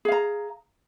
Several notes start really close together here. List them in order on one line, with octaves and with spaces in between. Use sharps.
G#4 F5 A#5